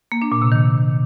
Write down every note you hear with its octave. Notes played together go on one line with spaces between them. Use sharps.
A#3
D4
A#2
C3
D#3